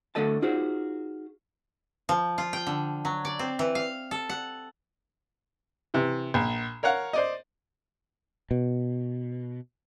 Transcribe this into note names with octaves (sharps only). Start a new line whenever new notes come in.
D2 D3 A3 A4 D#5 A5
D#4 F4 F#4 G#4 C5
F3
F4
G5
D3
F#3
D5
C4
E3
F5
A4
F#5
C3 E3
A#1
A#4 C#5 F5 F#5
C5 D5 D#5
B2